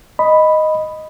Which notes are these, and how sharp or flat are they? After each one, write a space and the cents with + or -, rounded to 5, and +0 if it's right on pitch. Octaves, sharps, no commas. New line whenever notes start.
D#5 +0 B5 +0